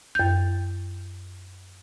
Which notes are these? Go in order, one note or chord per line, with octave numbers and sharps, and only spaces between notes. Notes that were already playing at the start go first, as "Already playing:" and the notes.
F#2 G6